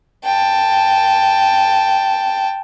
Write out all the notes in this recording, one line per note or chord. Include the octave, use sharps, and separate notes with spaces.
G5 A5